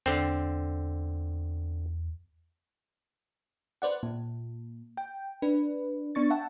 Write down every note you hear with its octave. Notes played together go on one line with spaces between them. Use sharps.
E2 D3 C4
B4 C5 D5 F#5
A#2
G5
D4 B4
B3 D4 C#6 A6
E5 F#5 G5 A5